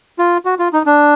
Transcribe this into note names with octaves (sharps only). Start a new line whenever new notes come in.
F4
F#4
F4
D#4
D4